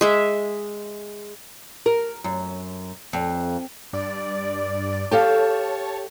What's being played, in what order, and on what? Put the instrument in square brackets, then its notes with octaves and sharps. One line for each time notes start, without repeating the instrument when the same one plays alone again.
[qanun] G#3 E5
[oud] A#4
F#2
F2
[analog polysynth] G2 D5
[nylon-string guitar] G4 A4 F5 [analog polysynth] C#5 A5